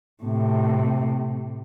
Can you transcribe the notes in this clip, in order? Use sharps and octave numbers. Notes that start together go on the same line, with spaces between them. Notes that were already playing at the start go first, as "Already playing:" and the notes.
A2 C3